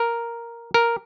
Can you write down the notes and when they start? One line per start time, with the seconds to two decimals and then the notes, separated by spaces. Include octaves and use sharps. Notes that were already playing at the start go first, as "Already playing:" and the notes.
Already playing: A#4
0.74 A#4